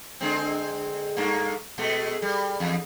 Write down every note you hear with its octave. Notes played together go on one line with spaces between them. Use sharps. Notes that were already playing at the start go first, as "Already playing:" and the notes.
D3 G#3 C4
G2 A3 A#3
B2 G#3 A3
G3
E2